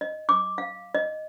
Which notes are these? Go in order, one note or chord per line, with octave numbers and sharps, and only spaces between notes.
D#5
D6
F5
D#5